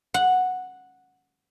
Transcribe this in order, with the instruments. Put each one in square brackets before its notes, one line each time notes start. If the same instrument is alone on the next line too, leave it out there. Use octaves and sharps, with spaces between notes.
[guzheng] F#5